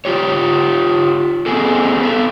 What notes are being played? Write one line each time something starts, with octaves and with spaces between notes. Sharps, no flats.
F4 G4 C#5
B3 C4 G#4 A4
B3 A4